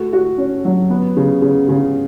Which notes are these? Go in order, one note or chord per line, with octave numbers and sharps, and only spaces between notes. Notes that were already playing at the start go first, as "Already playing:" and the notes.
Already playing: A3 F#4
F#4
C#4
F#3
B3
C#3
C#3
C#3